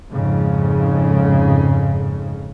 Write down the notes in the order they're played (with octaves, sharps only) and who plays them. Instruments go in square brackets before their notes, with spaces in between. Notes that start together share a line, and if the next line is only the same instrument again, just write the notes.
[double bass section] F2 G#2 C#3